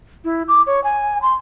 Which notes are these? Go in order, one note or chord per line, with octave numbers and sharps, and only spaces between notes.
E4
D6
C#5
G#5
C6